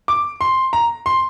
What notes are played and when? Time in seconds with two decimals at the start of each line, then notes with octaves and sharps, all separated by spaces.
0.08 D6
0.41 C6
0.73 A#5
1.06 C6